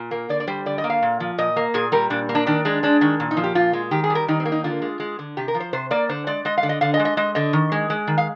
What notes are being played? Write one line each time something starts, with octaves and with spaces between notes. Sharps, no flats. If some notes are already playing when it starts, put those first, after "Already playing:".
Already playing: A#2
A#3
D3 D5
D5
G3 C5
D3 D5
D#5
A#3
F5
A#2
F3
A#2 D#5
A#3
A#2 G#4
G3 A#4
A#2 D4
A#3
D4
D#3 D4
G#3 D4
G#3 D4
D#3 D4
A#2
D#4
F3
G4
A#2 F4
G#3
D#3 G4
G#4
G3
A#4
D#3 D#4
C4
A#3
D#4
D3 F4
G#3
G#3
D3
C3 G4
A#4
F3
C5
C3 C5
A#3 D5
D3 C5
G#3 D5
G#3 D#5
F5
D3
D#5
D3 F5
D#5
G#3
D#5
G#3 D#5
D3 D#5
D#3
G#3
G#3
D#3
F5